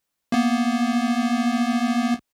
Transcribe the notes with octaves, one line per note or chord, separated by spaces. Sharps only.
A#3 B3